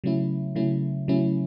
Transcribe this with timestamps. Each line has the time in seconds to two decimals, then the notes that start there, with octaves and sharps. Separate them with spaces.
0.04 C#3 F#3 A3 C#4 E4
0.55 C#3 F#3 A3 C#4 E4
1.08 C#3 F#3 A3 C#4 E4